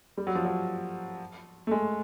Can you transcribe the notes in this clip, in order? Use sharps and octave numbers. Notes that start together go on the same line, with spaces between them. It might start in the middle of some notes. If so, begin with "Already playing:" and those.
G3
F#3
F3
F#3
A3
G#3